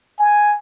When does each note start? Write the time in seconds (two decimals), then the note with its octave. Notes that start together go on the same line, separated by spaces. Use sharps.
0.19 G#5